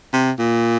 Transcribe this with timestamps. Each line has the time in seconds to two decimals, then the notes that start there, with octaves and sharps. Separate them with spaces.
0.13 C3
0.39 A#2